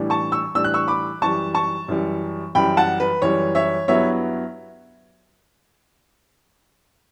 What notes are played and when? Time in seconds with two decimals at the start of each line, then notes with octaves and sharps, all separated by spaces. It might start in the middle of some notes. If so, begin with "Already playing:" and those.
Already playing: A2 E3 G3 D4
0.10 A5 C#6
0.32 C#6 E6
0.55 A2 E3 G3 D4 E6
0.64 F#6
0.74 C#6 E6
0.88 B5 D6
1.22 F#2 E3 G3 A5 C#6
1.55 A5 C#6
1.88 F#2 E3 G3
2.55 F#2 E3 G3 G5 B5
2.77 F#5 A5
3.00 B4
3.22 F#2 E3 G3 C#5
3.55 C#5 E5
3.88 G2 F#3 B3 E4 C#5 E5